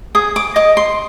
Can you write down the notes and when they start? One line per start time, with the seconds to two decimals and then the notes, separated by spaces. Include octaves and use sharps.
0.15 G#4 D#6
0.36 D6
0.56 D#5 D6
0.77 C6